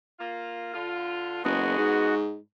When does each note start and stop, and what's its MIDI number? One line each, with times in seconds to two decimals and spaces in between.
0.20 0.71 58
0.20 0.71 65
0.74 1.43 50
0.74 1.43 65
1.44 1.76 30
1.44 2.15 56
1.44 2.15 59
1.44 2.15 66
1.78 2.38 44